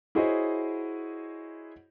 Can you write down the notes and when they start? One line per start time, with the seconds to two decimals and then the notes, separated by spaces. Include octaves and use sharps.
0.15 E4 F#4 G#4 C5 C#5 D#5